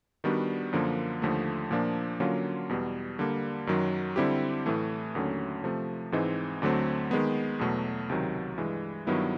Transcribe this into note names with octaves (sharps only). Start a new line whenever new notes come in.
D#3 G3 B3 D4 F#4
F#2 D3 F3 A#3
D#2 D3 F3 A3
A#2 F3 A#3 D4
D3 F#3 A#3 C#4 F4
E2 B2 G3
D3 G3 A#3
F#2 D#3 F#3
D3 G3 C4 E4 G4
A2 E3 A3
D#2 D3 F#3 A3 C#4
C3 F3 A3
G#2 E3 G#3 C4 D#4
D2 D3 F#3 A3 C4
D#3 G#3 B3
E2 B2 F#3 A3
C#2 C3 D#3 F#3
G2 E3 G#3
G2 D#3 F#3 B3 E4